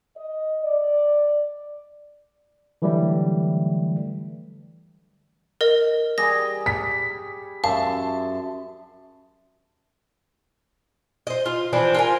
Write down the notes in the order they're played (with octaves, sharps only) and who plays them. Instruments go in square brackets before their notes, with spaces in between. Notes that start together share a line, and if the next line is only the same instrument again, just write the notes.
[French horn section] D#5
D5
[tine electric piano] D3 E3 F#3 G3 A3
[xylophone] A#4 D#5
[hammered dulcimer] G3 G#4 [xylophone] A#6
[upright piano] B6
[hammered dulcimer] F#2 E5 [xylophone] F5 [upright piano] A5
[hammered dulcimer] C6
[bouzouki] C5 D#5
F4
E3 F3 C4 D4
F4 A#4 G#5